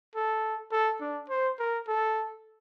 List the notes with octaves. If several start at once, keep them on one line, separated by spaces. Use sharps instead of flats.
A4
A4
D4
C5
A#4
A4